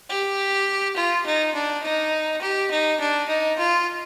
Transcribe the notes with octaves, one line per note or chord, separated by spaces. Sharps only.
G4
F4
D#4
D4
D#4
G4
D#4
D4
D#4
F4